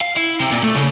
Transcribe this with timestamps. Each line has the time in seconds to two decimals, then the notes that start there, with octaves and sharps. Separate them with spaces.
0.01 F5
0.17 E4
0.41 C3
0.52 A#2
0.64 A3
0.75 C#3